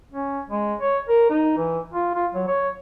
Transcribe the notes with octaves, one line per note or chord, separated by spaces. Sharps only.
C#4
G#3
C#5
A#4
D#4
E3
F4
F4
F#3
C#5